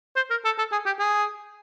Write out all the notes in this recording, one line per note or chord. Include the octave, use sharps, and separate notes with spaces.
C5
A#4
A4
A4
G#4
G4
G#4